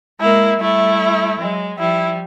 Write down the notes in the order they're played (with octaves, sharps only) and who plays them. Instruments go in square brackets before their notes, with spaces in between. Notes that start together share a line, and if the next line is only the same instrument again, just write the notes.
[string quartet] G#3 A#3 [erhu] E4
[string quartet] G3 A3 [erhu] E4
[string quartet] F#3 G#3
[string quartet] F3 G3 [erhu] E4